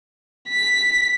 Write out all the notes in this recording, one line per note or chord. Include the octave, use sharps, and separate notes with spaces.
B6